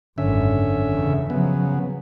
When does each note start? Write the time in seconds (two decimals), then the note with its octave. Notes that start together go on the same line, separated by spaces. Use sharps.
0.18 G#1 F#2 D3 C#4 E5
0.91 E2 C#3
1.30 C#3 F3 F#3 B3